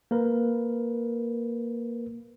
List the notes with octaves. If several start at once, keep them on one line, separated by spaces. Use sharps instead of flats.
A#3 A#4 B4